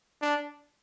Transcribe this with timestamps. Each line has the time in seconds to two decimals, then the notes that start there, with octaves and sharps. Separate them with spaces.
0.21 D4